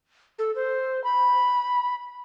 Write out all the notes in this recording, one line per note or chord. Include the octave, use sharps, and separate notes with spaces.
A4
C5
B5